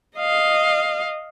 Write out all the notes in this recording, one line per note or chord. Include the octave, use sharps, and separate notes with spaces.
D#5 F5